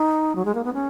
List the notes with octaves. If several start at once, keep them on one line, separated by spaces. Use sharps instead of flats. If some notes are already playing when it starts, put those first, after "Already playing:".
Already playing: D#4
F#3
G#3
A#3
B3
C#4